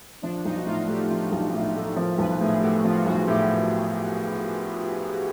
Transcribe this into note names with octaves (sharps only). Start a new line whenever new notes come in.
F3 D4
B1 D#4
F#4
A2 F4
A3 G4
F3 F4
B1
A2 F4
A3
F3 A#4
B1 B4
A2 G#4
G4
A3 F#4
F3 F4
F#4
F4
B1 F#4
A2 G4